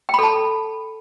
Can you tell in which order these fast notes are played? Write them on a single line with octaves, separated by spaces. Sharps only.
G5 B5 A4 A5